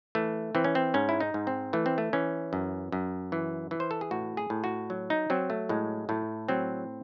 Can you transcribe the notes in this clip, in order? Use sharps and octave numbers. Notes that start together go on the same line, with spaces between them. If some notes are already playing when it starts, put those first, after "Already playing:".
E3 A3
E3 C4
C#4
C4
G#2 C#4
E4
D#4
G#2
C4
E3 A3
C4
A3
E3 C#4
F#2
F#2
E3
E3
C5
A4
G#4
A2 F#4
G#4
A2
F#4
F#3
D#4
F#3 C4
A3
A2 G#3
A2 A3
F#3 C4